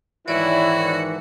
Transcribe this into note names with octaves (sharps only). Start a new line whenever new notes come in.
G#2 D#3 E3 E4 F#4 C#5 D5